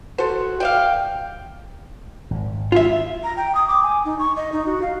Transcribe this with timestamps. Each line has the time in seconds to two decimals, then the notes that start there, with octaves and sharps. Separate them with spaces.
0.18 F#4 A4 C5
0.60 D5 E5 F5 G5
2.31 G#1
2.72 F4 E5
3.24 A#5
3.37 G5
3.55 D#6
3.68 D6
3.83 G#5
4.05 D#4
4.19 C#6
4.36 D#5
4.52 D#4
4.66 F#4
4.82 F5